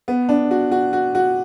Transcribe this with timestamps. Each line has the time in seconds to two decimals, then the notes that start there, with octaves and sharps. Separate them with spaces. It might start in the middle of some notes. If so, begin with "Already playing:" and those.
0.08 B3
0.29 D4
0.51 F#4
0.72 F#4
0.93 F#4
1.15 F#4